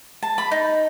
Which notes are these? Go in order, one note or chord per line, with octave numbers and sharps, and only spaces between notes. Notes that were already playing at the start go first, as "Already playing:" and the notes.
A5
B5
D#4